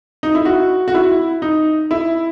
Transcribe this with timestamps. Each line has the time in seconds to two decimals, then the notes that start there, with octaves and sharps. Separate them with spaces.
0.23 D#4
0.35 E4
0.45 F#4
0.88 F#4
0.94 E4
1.42 D#4
1.91 E4